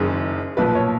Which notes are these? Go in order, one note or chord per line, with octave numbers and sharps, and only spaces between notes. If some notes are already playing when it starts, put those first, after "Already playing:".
Already playing: F#1 F#2 D#3 G#4
B1 A#2 F3 B4
C#5